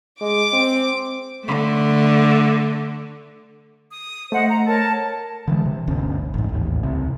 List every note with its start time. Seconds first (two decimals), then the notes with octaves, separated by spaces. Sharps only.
0.21 G#3 D6
0.53 C4
1.44 D3 A3
3.92 D#6
4.32 A3 C5 D#5 F#5
4.50 A#5
4.67 A#4 C#5 A5
5.48 D3 E3 G#3
5.65 C3
5.87 G1 D2 C#4
6.34 A1 G#2
6.49 A1 D#2
6.83 C#2 C3